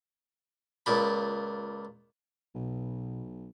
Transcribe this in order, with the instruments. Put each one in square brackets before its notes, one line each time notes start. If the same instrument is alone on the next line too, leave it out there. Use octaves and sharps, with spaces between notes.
[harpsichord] C#2 A#2 B5
[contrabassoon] B1 [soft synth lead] B2